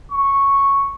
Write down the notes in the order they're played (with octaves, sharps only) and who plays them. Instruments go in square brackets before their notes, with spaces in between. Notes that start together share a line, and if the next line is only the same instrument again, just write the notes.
[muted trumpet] C#6